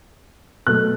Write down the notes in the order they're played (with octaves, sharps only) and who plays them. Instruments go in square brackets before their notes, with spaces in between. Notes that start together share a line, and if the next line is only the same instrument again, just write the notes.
[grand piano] B2 F#3 A3 F#6